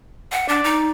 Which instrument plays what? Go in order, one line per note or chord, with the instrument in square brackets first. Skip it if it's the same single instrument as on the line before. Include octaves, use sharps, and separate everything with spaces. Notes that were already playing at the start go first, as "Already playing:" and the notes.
[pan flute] F#5
[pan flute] D4 [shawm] D5
[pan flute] D#4